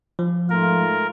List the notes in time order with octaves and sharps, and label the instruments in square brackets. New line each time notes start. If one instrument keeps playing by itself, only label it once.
[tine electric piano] F3
[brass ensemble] G#2 A3 F4 [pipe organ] A#4